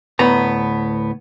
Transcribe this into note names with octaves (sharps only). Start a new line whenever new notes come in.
D2 A2 B3 A#5